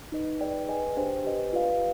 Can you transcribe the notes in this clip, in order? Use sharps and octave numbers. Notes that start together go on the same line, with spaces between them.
D#4 B4 D#5
D#4 G#4 B4 D5 G5
G#4 B4 D#5 G#5
D4 G4 C5 G5
G4 B4 D#5 G#5
F4 B4 D5 F5